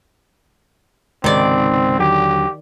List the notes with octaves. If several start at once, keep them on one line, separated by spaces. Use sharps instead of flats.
C#2 G#2 C3 D#3 C4 D5
D#2 D3 F#3 G4